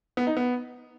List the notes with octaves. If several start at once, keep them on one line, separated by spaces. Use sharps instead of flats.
B3
D#4
B3